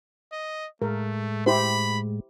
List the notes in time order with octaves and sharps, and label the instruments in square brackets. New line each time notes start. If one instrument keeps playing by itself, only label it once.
[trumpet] D#5
[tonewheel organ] A2 G#3 [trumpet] A3 [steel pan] A#4
[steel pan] E4 G4 C5 [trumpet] B5